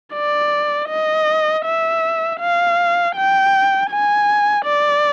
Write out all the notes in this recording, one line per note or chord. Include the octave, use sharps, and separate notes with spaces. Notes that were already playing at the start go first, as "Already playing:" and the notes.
D5
D#5
E5
F5
G5
G#5
D5